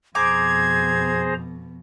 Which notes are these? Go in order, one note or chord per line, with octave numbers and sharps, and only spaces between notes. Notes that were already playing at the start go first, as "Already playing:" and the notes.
F2 B2 G#4 C5 A#5 D6 G#6